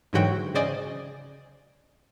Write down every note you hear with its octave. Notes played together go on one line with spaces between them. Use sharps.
G#2 D3 E3 F#3 F#4 G5
C#3 C5 D5 D#5 G#5